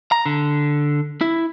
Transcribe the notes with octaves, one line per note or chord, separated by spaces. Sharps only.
A#5
D3
E4